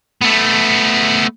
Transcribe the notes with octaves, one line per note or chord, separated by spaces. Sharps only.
A3 B3